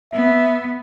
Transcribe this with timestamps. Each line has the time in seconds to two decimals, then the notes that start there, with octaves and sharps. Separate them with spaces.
0.13 B3 E5